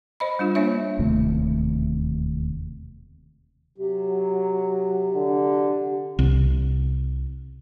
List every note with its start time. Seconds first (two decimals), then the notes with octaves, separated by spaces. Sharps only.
0.20 C5 D#5 B5
0.39 G3 D4 F4
0.55 A#3 D4 C#5 E5
0.99 E1 D#2 C3 A3
3.78 C3 F#3
5.14 D3
6.19 C2